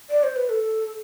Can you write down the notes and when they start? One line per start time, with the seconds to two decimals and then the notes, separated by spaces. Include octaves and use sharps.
0.10 D5
0.23 C5
0.36 B4
0.49 A4